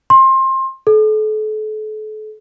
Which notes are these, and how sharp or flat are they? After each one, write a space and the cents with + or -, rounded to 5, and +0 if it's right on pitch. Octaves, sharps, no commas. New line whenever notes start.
C6 +25
A4 -35